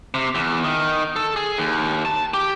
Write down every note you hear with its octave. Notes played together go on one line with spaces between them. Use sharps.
C3
E2
D#3
A4
G#4
D#2
A5
G4